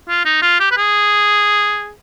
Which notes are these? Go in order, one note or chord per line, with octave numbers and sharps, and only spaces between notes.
F4
D#4
F4
G4
B4
G#4